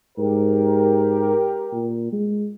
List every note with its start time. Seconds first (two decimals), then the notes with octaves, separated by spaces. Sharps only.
0.18 G#2 G4 A#4
1.72 A#2
2.12 G#3